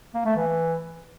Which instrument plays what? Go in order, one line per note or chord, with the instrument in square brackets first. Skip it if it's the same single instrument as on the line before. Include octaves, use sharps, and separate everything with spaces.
[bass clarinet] A#3
A3
E3